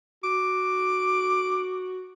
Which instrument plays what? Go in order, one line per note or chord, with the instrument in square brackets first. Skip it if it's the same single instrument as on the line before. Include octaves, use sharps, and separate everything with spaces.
[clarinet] F#4 [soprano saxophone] D6